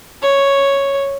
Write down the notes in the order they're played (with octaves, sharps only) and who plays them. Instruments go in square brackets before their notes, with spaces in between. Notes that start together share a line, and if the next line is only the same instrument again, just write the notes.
[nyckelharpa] C#5